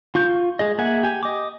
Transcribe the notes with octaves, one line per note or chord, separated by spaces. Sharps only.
F4 C#6 G6
G#3 G#4 D#5
A#3 G#4 E5 F#5 G#5
G4 G#5
D#5 D6